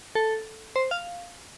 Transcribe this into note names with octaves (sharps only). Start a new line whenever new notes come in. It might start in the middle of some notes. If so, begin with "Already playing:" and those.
A4
C5
F5